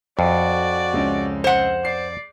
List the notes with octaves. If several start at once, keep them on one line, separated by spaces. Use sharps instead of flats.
F2 F#4 D5
C#2 C#4
C5 F#5
D5 C7